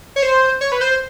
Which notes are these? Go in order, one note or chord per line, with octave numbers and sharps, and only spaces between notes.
C#5
C5
C#5
B4
C5